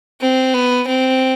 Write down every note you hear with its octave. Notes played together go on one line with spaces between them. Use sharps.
C4
B3
C4